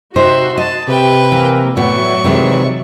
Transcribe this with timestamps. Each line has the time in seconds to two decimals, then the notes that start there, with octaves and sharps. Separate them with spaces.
0.16 C3 D#4 F#4 C5 E5 C6
0.58 D#5 A5
0.87 C3 G4 B4 G5
1.32 E3 A#3 A#4
1.77 A2 F#3 B3 D5 E5 C#6
2.24 C3 D#3 E3 G#3